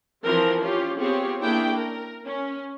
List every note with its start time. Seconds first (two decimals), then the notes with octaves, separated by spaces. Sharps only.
0.24 E3 F3 C4 A#4 C5
0.61 C#4 F4 G4
0.99 B3 C4 F4 G4 G#4 C#5
1.42 A#3 C#4 D4 E4 G#4 G5
1.75 A#4
2.25 C#4